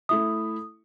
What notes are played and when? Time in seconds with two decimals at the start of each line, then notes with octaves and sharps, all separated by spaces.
0.09 A3 E4 E5 D#6